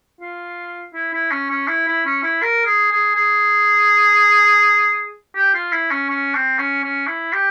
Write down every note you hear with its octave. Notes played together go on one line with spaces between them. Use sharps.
F4
E4
E4
C#4
C#4
E4
E4
C#4
E4
A#4
G#4
G#4
G#4
G4
F4
E4
C#4
C#4
C4
C#4
C#4
E4
G4